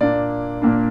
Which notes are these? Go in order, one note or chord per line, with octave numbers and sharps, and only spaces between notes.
A#2 A#3 D4 D5
A#2 A#3 D4